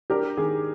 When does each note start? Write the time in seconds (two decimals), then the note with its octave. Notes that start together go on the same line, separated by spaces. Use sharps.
0.10 D4 G4 A#4
0.37 D#3 G#4